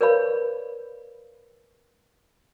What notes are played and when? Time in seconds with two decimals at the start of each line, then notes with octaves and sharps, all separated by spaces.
0.01 A#4 B4 C#5 D5 F5 B5